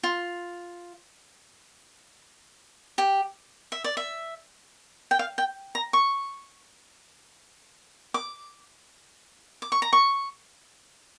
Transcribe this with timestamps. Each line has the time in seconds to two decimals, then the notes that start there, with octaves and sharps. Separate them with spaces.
0.03 F4
2.98 G4
3.72 E5
3.84 D5
3.97 E5
5.11 G5
5.19 F5
5.38 G5
5.75 A#5
5.93 C#6
8.14 D6
9.62 D6
9.72 C#6
9.82 A#5
9.93 C#6